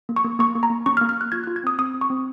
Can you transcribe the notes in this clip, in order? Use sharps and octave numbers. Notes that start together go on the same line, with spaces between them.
A#3
C#6
A#3
A#3 C#6
A#3
A#5
A#3
C#4 C#6
F6
A#3
F6
A#3 F#6
F4 G#6
F#6
F4
G#6
C4 D#6
C4 D#6
C4
C#6
C4